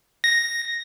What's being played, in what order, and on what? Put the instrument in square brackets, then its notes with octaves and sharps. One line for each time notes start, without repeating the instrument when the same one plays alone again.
[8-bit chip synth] A#6